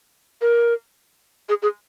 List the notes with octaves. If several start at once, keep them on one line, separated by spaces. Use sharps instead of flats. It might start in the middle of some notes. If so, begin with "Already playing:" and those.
A#4
G#4
G#4